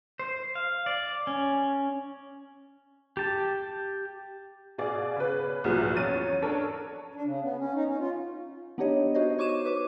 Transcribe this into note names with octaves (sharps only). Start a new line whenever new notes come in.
C5
F5
D5
C#4
G4 A5
B2 G#4 D5 F5
C#3 B4
C2 A#2 F3 F#3 B3
E2 C#4 A6 D#7
C#4
C#4 D4 A4 A#4 C#5 A5
D4
C#3
B3
C#4
D#4
C#4
F4
B3 D4 D#4 G4 C#5 D#5
D#4 F#4 C5 C#5 D#5
C#5 C#6 D6 D#7 E7
B4 D6